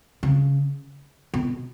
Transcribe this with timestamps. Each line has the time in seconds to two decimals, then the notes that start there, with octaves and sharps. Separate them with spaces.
0.23 C#3
1.34 B2